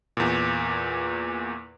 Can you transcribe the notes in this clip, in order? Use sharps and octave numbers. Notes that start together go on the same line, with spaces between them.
E2 A#2